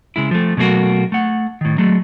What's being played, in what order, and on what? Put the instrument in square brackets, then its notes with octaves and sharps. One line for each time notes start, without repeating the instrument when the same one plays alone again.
[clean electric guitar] C#3 G#3 E4
F3 A3
B2 F#3 A3 A#3 F#4
A3 F#5
A2 D#3
F#3 G#3 A3